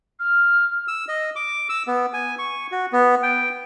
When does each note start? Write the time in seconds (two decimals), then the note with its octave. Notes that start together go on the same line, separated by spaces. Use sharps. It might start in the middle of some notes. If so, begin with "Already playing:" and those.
0.19 F6
0.88 E6
1.08 D#5
1.36 D6
1.69 E6
1.87 B3
2.13 G#5
2.39 C#6
2.72 F#4
2.92 B3
3.23 G5